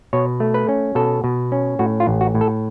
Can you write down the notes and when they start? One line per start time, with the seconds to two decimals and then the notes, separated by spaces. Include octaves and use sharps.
0.13 B2 C#5
0.40 A3
0.54 B4
0.68 C#4
0.95 B2 A4
1.24 B2
1.52 C#4
1.79 A2 F#4
2.00 F4
2.07 A1
2.21 F#4
2.34 A2
2.41 A4